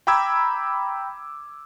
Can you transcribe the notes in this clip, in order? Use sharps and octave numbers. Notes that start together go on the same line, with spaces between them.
G5 A#5 B5 D6 E6 G#6